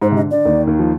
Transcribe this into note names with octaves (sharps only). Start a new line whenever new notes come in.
G#2 G#3 C5
C3
D3 D#5
D3 D5
D#2 D#3
D#2 D#3
F3